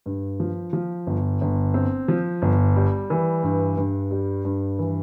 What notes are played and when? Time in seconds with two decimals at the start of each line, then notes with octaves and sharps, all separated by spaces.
0.06 G2
0.40 F3
0.73 F3
1.07 G1
1.41 G1
1.74 C4
2.08 F3
2.42 G1
2.76 G3
3.10 E3
3.43 G2
3.77 G2
4.11 G3
4.45 G2
4.79 E3